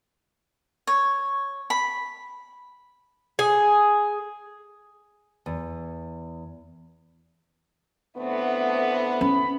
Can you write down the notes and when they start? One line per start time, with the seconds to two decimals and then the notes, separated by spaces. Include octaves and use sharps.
0.87 C#5
1.70 B5
3.39 G#4
5.46 E2
8.17 A2 D3 A3 B3 C4
9.21 C#4 B5